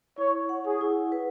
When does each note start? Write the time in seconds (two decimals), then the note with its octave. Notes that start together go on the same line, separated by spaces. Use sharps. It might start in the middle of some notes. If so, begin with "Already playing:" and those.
0.18 E4 C#5
0.49 F#5
0.65 G#4
0.81 E4
1.12 B4